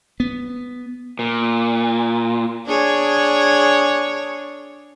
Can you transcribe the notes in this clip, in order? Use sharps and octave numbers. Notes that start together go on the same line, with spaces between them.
B3
A#2
D4 G#4 C#5